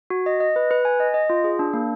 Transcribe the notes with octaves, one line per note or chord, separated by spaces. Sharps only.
F#4
D#5
D#5
B4
B4
G#5
D#5
D#5
F4
G#4
D4
A#3